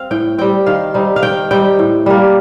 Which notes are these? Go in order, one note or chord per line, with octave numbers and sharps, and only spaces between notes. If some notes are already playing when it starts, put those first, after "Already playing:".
Already playing: C4 F5
A2 G5
G3 C4 G5
D#3 F5
G3 C4 D#4
F5
D#3 G5
G3 C4 D#4 G5
A2
G3 A#3